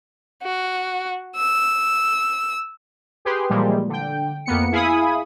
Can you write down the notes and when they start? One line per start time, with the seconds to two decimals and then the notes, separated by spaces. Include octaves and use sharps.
0.42 F#4
1.37 E6
3.25 G4 G#4 B4 C6
3.50 A#2 E3 F3 G3 G#3 A#3
3.89 D3 G5
4.46 F2 A#3 B3 C#7
4.72 E4 G#4 F5 G#5 B5 D#6